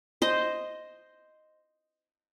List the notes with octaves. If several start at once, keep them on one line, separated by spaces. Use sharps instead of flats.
C5 D#5